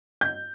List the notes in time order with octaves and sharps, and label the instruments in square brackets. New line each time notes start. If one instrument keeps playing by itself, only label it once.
[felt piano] G6